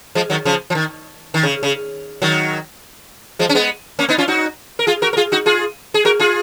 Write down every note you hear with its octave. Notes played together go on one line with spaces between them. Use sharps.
F3 G#3
D#3 F#3
C#3 F3
F3
D#3
D#3
C#3
C#3
D#3 F#3
F3 G#3
C#4
G#3 B3
A#3 C#4
B3 D#4
C#4 F4
D#4 F#4
A#4
F4 G#4
F#4 A#4
A#4
F4 G#4
D#4 F#4
F4 G#4
G#4
F#4 A#4
F4 G#4